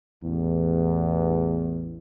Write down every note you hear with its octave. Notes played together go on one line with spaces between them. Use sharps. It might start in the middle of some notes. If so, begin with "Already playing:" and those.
A1 E2